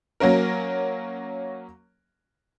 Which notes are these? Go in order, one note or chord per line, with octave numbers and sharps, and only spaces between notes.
F#3 A#3 C#4 A#4